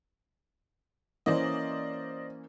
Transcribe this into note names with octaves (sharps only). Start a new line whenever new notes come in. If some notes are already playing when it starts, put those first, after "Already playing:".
E3 A#3 C#4 C5 D5 D#5